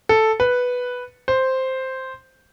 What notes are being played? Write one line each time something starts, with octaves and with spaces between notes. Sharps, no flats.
A4
B4
C5